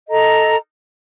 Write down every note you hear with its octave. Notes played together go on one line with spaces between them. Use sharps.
A4 D#5 A#5